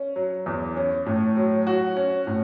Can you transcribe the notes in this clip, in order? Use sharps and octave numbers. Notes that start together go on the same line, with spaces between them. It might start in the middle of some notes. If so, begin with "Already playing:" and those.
Already playing: C#4
F#3
E2
C#4
A2
F#3
F#4
C#4
A2